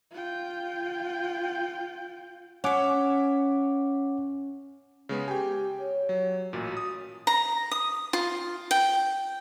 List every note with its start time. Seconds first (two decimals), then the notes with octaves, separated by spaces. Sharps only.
0.11 F4 G5
2.64 C#4 C#5 E5 F#5 D6
5.09 C#3 G#3 B3
5.28 G4 G5 G#5
5.79 C#5
6.09 F#3
6.53 A1 A#2 F#4
6.77 D#6
7.27 A#5
7.71 D#6
8.13 F4
8.71 G5